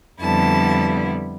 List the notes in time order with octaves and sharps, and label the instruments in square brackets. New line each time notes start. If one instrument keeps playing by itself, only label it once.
[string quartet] F2 D3 G3 B3 E4 A5